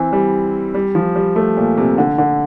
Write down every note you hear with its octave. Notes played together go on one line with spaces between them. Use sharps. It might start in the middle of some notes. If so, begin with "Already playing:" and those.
Already playing: E3 C4
G3
G3
F3
G3
A3
A#2
C3
D3
D3